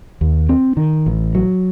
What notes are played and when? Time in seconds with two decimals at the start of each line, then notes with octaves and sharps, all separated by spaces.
0.21 D#2
0.49 C4
0.77 D#3
1.06 A1
1.35 F#3